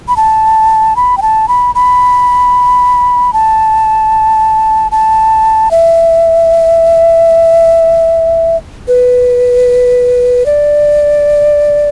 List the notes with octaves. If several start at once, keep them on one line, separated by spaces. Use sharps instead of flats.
B5
A5
B5
G5
A5
B5
B5
A5
A5
E5
B4
D5